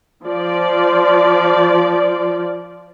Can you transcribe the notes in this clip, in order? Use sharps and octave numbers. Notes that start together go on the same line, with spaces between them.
F3 D5